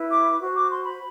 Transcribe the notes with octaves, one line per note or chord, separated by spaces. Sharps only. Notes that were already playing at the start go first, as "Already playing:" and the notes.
Already playing: E4 B4
D6
F#4 C5
D6
C6
B5